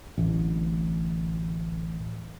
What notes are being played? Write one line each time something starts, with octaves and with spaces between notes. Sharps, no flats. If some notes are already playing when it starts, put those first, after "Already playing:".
D1 A1